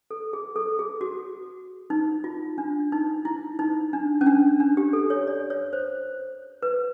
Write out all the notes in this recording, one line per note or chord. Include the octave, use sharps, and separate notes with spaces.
A4
G#4
A4
G#4
F#4
D#4
F4
D4
D#4
E4
D#4
D4
C#4
D4
D4
G4
A4
C#5
D5
C#5
C5
B4